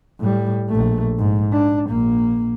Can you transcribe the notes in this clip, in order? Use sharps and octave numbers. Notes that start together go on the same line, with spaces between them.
A2 G3
A#1 A3
G#2
D4
A#1 A#3